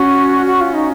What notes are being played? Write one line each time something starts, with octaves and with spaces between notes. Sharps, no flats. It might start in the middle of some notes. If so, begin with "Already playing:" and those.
Already playing: C#4 F#4
F#4
F4
D#4